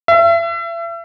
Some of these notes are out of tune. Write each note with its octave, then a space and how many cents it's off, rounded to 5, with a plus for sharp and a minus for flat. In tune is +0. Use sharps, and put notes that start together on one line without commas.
E5 +35